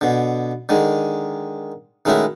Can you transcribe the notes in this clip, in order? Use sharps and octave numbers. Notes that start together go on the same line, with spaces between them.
B2 D3
D3 D#3 G#3
D#3 G#3 A3 C#4 E4 F#4